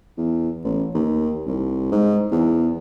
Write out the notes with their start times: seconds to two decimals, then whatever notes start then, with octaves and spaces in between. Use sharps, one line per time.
0.17 E2
0.64 A1
0.94 D#2
1.46 C2
1.92 G#2
2.31 E2